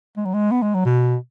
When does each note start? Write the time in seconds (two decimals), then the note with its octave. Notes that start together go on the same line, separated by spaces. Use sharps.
0.17 G#3
0.25 F#3
0.34 G#3
0.51 B3
0.62 G#3
0.74 F#3
0.85 B2